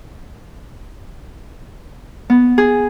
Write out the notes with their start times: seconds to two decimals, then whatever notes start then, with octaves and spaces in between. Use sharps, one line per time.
2.30 B3
2.58 G#4